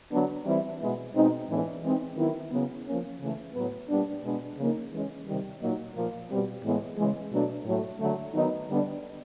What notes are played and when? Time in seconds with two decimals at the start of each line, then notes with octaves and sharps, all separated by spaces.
0.11 D3 F#3 B3 D4
0.45 E3 G3 C4 E4
0.80 B2 G#3 B3 E4
1.14 B2 G#3 C4 D#4
1.49 A2 E3 G#3 B3 D4
1.83 E3 G#3 C4 D#4
2.17 D#3 F#3 B3 E4
2.51 C#3 F#3 B3
2.86 F3 A#3 C#4
3.21 C#3 E3 A3
3.54 A2 F#3 B3
3.89 A#2 G3 B3 D4
4.24 B2 G#3 B3 D4
4.57 C#3 F3 A#3 D#4
4.91 E3 G#3 C#4
5.26 C3 D#3 G3
5.60 A#2 F#3 A#3 D#4
5.94 A#2 F3 A#3
6.29 B2 G3 C4
6.64 A2 E3 G#3 B3
6.98 C#3 E3 G#3
7.32 B2 F#3 A3 D4
7.66 A2 F#3 A3
8.00 D3 F#3 A3
8.34 D#3 F#3 B3 D#4
8.69 D3 G3 B3 D4